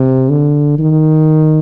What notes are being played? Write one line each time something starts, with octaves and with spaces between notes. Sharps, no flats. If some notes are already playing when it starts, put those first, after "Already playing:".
Already playing: C3
D3
D#3